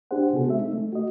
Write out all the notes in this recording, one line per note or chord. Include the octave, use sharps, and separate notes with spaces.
D4 G4 G#4 C5 F#5
C3 B3 F#4 G#4 A4
G#3 C4 E5
D#4
A3
F#4 D#5